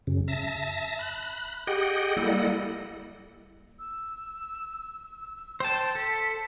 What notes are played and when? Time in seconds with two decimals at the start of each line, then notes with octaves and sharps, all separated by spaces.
0.07 F#2 C#3
0.28 E5 A5 A#6
0.99 B5 F#6
1.67 G4 G#4 D#5 F#5 G5
2.17 G3 A#3 E4 A4 D#5 F#5
3.79 E6
5.60 C5 G5 A5
5.95 A4 B6